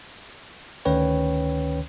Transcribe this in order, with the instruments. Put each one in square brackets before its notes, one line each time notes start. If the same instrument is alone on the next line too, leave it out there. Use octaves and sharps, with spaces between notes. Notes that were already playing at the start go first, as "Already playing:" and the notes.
[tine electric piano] D2 D#3 C#4 B4 C#5 G5